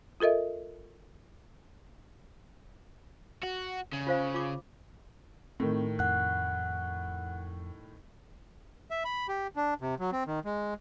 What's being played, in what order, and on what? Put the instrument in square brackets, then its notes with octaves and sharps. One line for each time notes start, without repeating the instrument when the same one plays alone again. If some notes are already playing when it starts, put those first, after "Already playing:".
[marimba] F4 A4 A#4 D#5 E5
[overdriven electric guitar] F#4
C#3
[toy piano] F4 C5 F5
F4 D6
[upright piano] A2 D#3 [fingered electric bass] C4
[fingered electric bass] F2 [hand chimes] F#5 F#6
[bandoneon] E5
B5
G4
D4
C3
F#3
C4
D#3
G#3